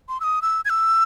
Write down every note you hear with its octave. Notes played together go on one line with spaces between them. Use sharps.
C6
E6
D#6
E6
G#6
E6